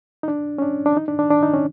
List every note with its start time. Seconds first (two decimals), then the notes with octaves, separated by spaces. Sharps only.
0.23 D#4
0.28 D4
0.58 C#4
0.62 D4
0.86 D4
0.97 D#4
1.08 D4
1.19 D4
1.31 D4
1.43 D#4
1.53 C#4